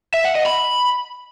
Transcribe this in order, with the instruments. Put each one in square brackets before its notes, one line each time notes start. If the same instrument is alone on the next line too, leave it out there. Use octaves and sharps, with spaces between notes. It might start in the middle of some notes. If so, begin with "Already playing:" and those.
[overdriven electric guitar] E5
F#5
D#5
B5